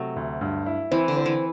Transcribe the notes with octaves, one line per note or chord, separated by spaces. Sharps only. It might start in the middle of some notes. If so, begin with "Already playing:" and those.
Already playing: C3 F#3 A3
D2
G2
E4
E3 C4
D3
C4
E3